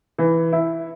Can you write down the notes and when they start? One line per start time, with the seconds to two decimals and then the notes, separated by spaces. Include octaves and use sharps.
0.18 E3
0.52 E4